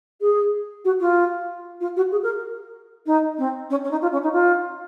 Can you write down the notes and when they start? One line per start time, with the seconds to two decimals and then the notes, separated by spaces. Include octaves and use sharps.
0.21 G#4
0.84 F#4
1.00 F4
1.80 F4
1.96 F#4
2.11 G#4
2.22 A#4
3.06 D#4
3.38 C4
3.70 C#4
3.84 C#4
3.90 D#4
4.01 F4
4.12 C#4
4.23 D#4
4.33 F4